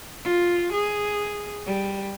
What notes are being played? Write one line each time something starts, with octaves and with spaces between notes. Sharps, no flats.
F4
G#4
G3